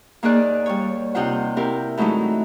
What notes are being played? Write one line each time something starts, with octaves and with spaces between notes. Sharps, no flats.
D#2 A#3 D#4 G#4 D5 F#6
G3 C#5
C3 D#4 F4 C5 F#5
C4 E4 G4 A#4
E3 F#3 G#3 A3 D#4